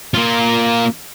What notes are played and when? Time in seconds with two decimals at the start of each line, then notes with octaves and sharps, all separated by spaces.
0.14 A#3 F4